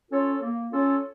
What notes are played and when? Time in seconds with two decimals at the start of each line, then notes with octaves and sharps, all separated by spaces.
0.11 C#4 F4 A4 C#5
0.42 A#3
0.72 C#4 F4 A4 C#5